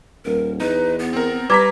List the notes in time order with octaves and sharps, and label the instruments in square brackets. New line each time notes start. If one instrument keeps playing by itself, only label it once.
[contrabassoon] D#1 [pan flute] A#4
[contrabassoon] E2 [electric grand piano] D#4 [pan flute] B4
[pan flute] B3
[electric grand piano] C4 A#4
[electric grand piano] G3 A#5 B6 [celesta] B4 D6 G#6